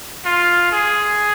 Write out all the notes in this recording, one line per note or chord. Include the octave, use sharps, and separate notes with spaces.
F4
G#4